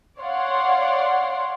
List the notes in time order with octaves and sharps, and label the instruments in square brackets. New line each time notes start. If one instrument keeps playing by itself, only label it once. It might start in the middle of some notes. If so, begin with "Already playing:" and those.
[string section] C#5 D5 F5 F#5 C6